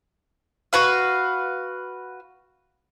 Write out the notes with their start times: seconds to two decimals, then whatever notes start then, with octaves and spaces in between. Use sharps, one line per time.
0.73 F#4 B4 F5